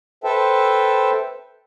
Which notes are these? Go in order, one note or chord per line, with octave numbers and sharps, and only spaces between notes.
A4 B4 C5 E5 G5 A5